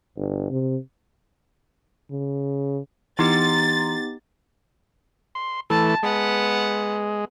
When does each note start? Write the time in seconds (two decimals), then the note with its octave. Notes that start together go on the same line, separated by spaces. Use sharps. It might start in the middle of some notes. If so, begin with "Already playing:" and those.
0.17 G1
0.50 C3
2.11 C#3
3.19 E3 B3 D#4 G4 A#5 C6 A6
5.35 C6
5.70 E3 A3 A5
6.03 G#3 B3 F#5